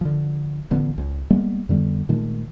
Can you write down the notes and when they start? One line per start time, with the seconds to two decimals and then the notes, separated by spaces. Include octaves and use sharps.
0.01 D3 F3
0.71 A1 D3 F3 B3
0.98 C#2
1.30 G3 G#3 A#3 B3
1.69 F2 D3 G3 B3
2.09 A#2 D#3 G#3 A3